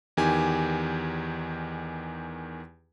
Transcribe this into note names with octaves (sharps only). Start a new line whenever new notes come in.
E2 D#3 G4 G#5